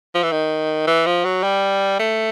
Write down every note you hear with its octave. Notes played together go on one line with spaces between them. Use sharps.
F3
E3
D#3
E3
F3
F#3
G3
A3